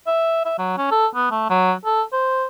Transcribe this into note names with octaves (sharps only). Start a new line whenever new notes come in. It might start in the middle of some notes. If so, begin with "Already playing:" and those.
E5
E5
F#3
C#4
A4
B3
A3
F#3
A4
C5